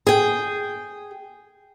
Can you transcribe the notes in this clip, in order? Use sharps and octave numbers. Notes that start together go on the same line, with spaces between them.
G#4 G5